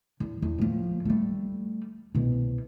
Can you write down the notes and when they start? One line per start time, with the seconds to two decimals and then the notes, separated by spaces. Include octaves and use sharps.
0.20 E2
0.42 E2
0.59 A2 F3
1.05 G3 A3
2.15 C2 B2